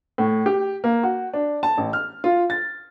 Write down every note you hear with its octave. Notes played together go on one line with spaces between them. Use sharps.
A2
G4
A#3
F#4
D4
A5
A1
F6
F4
A6